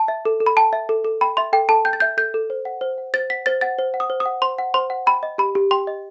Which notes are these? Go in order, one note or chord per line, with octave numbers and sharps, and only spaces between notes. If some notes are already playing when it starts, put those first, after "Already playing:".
Already playing: A5
E5
A4
A4
B5
G5 A5
E5
A4
A4
G5 B5
E5 C6
A4 G5
A4 A5
G5 G6
A6
E5 G6
A4 G6
A4
C5
F#5
C5
F#5
C5 A6
F#5 B6
C5 A6
F#5 A6
C5
F#5
D#6
C5
D#6
F#5
C5 C6
F#5
C5 C6
F#5
G5 B5
D#5
G4 B5
G4
G5 C6
D#5